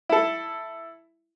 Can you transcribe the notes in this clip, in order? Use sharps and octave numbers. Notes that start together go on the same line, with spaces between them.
E4 A4